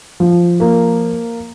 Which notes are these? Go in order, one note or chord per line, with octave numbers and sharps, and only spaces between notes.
F3
A#3